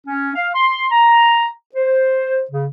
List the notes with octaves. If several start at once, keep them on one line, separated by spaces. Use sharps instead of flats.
C#4
F5
C6
A#5
C5
C#3